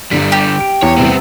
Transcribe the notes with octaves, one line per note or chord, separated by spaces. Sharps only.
G1 D3 G3 B6
G4
D7
E2 C#5
A2 C3 G3 B3 C4